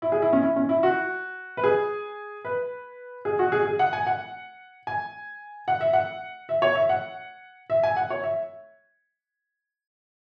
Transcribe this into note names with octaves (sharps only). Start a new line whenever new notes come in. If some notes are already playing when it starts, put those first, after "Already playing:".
E4
G#4
E4
C#4
E4
C#4
E4
F#4
B4
G#4
B4
G#4
F#4
G#4
G#4
F#5
G#5
F#5
G#5
F#5
E5
F#5
E5
C#5
E5
F#5
E5
G#5
F#5
C#5
E5